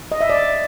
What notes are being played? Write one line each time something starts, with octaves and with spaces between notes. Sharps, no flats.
D#5
E5
D5